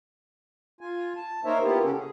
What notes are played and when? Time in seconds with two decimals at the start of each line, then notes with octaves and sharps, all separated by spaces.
0.81 F4 G#5
1.17 A5
1.45 A#3 D#4 A#4 C5 C#5 E5
1.61 A#3 B3 E4 F4 G4
1.83 C#3 C#4 F#4 G4 A4
1.97 G#4